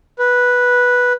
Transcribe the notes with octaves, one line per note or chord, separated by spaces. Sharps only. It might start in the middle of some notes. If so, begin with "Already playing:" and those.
B4